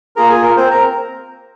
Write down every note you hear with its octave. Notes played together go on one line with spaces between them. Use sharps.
A#3 F4 G#4 A#4 A#5
G#4 G#5
A#4
C4 C5
A#4 A#5